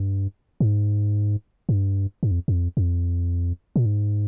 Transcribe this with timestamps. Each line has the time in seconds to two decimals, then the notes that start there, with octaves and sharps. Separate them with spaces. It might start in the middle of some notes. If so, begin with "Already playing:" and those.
Already playing: G2
0.60 G#2
1.69 G2
2.23 G2
2.31 F2
2.48 F2
2.77 F2
3.76 A#2
3.86 G#2